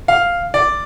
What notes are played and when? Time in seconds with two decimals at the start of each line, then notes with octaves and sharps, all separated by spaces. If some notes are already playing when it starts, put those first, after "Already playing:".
0.08 F5
0.54 D5